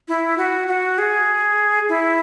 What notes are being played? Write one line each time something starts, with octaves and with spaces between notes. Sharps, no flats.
E4
F#4
F#4
G#4
E4